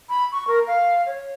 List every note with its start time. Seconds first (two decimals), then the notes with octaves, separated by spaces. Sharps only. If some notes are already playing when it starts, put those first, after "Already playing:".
0.09 B5
0.32 C#6
0.47 A#4
0.67 F5
1.06 C#5